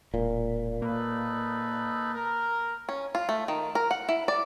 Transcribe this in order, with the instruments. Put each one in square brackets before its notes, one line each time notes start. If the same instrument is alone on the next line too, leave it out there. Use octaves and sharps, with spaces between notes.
[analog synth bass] E1 [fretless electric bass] A#2
[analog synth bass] A#3 [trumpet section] D#4 A4 B4
[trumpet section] A#4
[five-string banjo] C#4
F4
A3
D#3
A#4
F#5
E4
D5